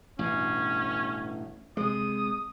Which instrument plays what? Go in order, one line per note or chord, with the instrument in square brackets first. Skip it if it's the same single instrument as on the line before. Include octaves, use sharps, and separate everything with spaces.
[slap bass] A1 G2 B2 [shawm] C#4
[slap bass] C3 G#3 [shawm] D#6